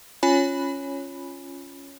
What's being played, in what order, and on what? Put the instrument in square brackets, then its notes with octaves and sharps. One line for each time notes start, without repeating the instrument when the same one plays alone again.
[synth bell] C#4 F4 C#5 G#5 B5